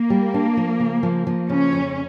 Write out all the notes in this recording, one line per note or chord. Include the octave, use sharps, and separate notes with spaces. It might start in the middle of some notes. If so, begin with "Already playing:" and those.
Already playing: A#3
G3
D4
F3
C#3
F3
F3
C#3 C#4
F2